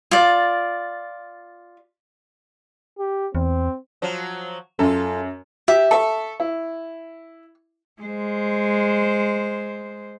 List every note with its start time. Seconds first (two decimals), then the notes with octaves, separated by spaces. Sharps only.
0.11 F4 D5
2.99 G4
3.35 E2 C4
4.02 F3 F#3
4.79 F#2 F4 A4
5.68 G4 E5
5.91 A4 E5 C#6
6.40 E4
8.01 G#3 C5